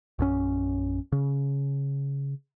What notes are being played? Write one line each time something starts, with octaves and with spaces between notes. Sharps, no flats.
A#1 F#2 C#4
C#3